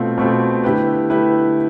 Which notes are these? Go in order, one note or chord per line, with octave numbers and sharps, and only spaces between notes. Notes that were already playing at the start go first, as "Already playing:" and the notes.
Already playing: B2 A3 C4 F4
B2 A3 C4 F4
D3 A3 E4 G4 B4
D3 A3 E4 G4 B4